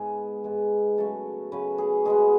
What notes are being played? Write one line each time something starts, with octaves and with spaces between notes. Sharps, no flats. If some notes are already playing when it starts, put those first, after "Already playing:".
Already playing: G#2 G#3 B3 G#4
G#2 G#3 B3
C#3 F#3 A3 A4
C#3 F#3 A3 B4
G#4
B2 G#3 B3 G#4